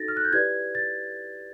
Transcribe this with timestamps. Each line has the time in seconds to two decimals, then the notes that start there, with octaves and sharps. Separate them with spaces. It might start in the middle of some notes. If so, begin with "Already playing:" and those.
Already playing: D#4 F#4 A4 A6 A#6
0.08 F6
0.17 F#6
0.25 G6
0.32 E4 G4 B4 D5 G#6
0.75 A6